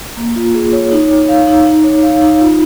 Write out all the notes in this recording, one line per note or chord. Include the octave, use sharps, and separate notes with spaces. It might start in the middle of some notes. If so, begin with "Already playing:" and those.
A#3
F4
G#4
C#5
D#4
C#5
F5
D#4
D#4
C#5
F5
D#4
F4